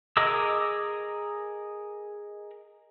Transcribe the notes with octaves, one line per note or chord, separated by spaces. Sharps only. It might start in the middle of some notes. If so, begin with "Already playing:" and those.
G#4 A#4 D#5 D6 E6